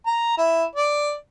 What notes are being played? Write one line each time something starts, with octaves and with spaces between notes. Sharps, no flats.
A#5
E4
D5